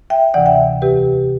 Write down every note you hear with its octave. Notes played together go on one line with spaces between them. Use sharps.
E5 G5
D2 C3 E3 D5 F#5
E5 G5
E2 C3 E3 G4 B4